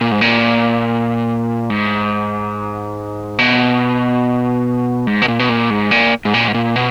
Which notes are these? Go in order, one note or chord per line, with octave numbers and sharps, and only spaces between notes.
A#2
G#2
A#2
G#2
B2
G#2
B2
A#2
B2
A#2
G#2
A#2
G#2
A#2
G#2
A#2
B2